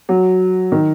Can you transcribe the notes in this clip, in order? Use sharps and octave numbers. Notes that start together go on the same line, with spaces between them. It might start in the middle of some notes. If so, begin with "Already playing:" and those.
F#3
D#3